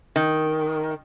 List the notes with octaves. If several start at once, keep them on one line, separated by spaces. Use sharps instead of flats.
D#3